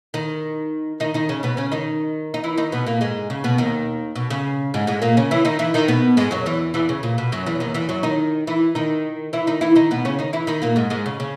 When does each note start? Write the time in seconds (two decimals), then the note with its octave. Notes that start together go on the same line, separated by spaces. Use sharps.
0.14 D#3 D#4
1.00 D#3 D#4
1.14 D#3 D#4
1.29 C#3 C#4
1.43 B2 B3
1.57 C#3 C#4
1.72 D#3 D#4
2.34 D#4
2.44 E3 E4
2.57 D#3 D#4
2.72 B2 B3
2.87 A#2 A#3
3.01 G#2 G#3
3.30 C#3
3.44 B2 B3
3.58 D#2 D#3
4.16 B2
4.30 C#3
4.74 G#2 G#3
4.87 G#2 G#3
5.02 A#2 A#3
5.17 C#3 C#4
5.31 E3 E4
5.45 D#3 D#4
5.59 E3 E4
5.74 D#3 D#4
5.88 B2 B3
6.17 G#2 G#3
6.31 F#2 F#3
6.46 E2 E3
6.74 E2 E3
6.89 C#3
7.03 A#2
7.18 B2
7.32 F#2 F#3
7.46 E2 E3
7.60 D#2 D#3
7.74 E2 E3
7.89 F#2 F#3
8.03 D#3 D#4
8.47 E3 E4
8.75 D#3 D#4
9.33 E3 E4
9.47 D#3 D#4
9.61 E3 E4
9.76 D#3 D#4
9.91 B2 B3
10.05 C#3 C#4
10.19 D#3 D#4
10.33 E3 E4
10.47 D#3 D#4
10.62 A#2 A#3
10.76 G#2 G#3
10.90 G#2 G#3
11.06 C#3
11.20 C#3